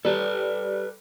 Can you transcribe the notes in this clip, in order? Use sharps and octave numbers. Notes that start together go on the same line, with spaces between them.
G3 A4 B4